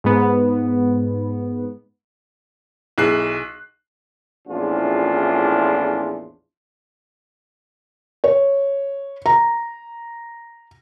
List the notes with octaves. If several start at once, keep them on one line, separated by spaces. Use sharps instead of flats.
G#2 B3
B1 E4 G#4 F#6 C7
A#1 E2 A2 C#4 D4 F4
C#5
A#5